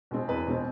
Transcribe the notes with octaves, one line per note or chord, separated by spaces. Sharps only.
B2 G#3 C4
E2 B4
B2 G#3 C4